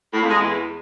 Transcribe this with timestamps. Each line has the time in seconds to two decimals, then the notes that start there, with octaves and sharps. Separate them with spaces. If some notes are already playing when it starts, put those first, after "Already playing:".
0.14 A2
0.22 F2
0.30 G#3
0.39 E2